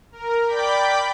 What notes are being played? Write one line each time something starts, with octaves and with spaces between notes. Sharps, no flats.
A#4
D5 G5 B5 D6 G6 B6